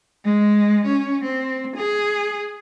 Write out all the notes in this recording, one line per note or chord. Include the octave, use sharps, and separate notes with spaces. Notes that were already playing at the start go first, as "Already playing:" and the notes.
G#3
C#4
C4
G#4